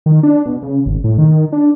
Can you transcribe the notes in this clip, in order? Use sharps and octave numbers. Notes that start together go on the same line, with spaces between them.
D#3
D4
B2
C#3
G#1
A2
D#3
D4